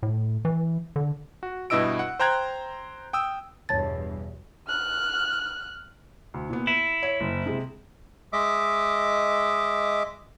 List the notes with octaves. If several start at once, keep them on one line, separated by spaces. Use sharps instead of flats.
A2
E3
D3
F#4
G2 B2 E4 D#5 E6 D7
F#5
C5 G5 A#5 F#6 G#6
G5 D#6 E6
E2 G2 B2 C#5 A5 A6
F6 F#6
D2
A#2 B3
E4 D#7
C#5
F#1
C3 G#3
G#3 D#5 E5 D6